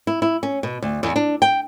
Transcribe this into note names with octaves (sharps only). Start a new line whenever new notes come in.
E4
E4
C#4
B2
D2
E2
D4
G5